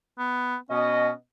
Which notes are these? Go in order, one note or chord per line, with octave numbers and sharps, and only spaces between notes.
B3
B2 C#4 D#5